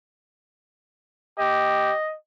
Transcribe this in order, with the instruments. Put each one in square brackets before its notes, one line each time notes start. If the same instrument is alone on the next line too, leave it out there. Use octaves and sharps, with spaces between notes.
[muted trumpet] G4 [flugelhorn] D#5